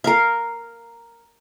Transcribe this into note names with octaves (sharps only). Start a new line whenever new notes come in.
A#4 F5